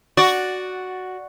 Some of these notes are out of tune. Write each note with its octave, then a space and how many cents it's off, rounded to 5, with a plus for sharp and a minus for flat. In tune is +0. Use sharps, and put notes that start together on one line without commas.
F#4 +0 D5 +0